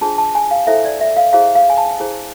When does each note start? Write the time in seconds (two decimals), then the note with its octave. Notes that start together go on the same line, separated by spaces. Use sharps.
0.01 D4 F4 G#4 C5 A5
0.18 A5
0.35 G#5
0.51 F5
0.67 E4 A4 C5 E5
0.85 D5
1.01 E5
1.17 F5
1.33 E4 G#4 C5 F5
1.55 F5
1.70 G#5
1.78 A5
2.00 E4 G#4 C5